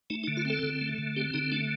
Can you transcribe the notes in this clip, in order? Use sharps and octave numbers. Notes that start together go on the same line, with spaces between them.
A3 D#4
D#4
D3
F4
C4 A4
D3
A3
D3
C4 G4
D3 D#4
A3 D4